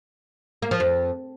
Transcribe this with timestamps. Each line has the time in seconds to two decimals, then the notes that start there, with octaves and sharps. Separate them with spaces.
0.62 A#3
0.71 F3
0.80 F2